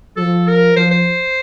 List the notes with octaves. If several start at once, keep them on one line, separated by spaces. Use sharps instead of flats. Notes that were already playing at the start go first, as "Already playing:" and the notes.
F3 A4
A#4
F3 C5
C5